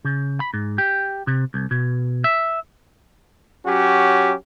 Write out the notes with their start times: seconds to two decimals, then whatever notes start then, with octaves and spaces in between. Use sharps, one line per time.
0.05 C#3
0.40 B5
0.54 G#2
0.78 G4
1.27 C3
1.54 C2
1.71 B2
2.24 E5
3.65 F#3 C#4 F#4 G4